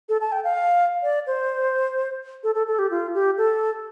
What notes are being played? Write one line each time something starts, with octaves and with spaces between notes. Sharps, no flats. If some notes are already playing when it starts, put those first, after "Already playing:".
A4
A5
G5
F5
D5
C5
A4
A4
A4
G4
F4
G4
A4